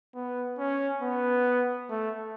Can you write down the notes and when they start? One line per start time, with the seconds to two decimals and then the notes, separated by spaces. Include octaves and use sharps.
0.14 B3
0.58 C#4
1.02 B3
1.89 A3